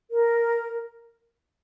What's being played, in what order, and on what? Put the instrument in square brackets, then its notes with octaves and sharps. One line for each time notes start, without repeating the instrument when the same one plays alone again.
[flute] A#4